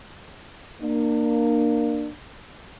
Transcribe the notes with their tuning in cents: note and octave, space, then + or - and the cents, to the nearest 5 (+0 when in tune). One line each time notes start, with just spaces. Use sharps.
A#3 +0 D4 +30